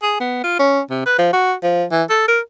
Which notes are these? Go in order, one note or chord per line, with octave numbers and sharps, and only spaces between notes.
G#4
B3
F4
C#4
C3
B4
F3
F#4
F3
E3
A4
A#4